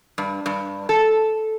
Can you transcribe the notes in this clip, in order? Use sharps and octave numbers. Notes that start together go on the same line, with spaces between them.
G2
G2
A4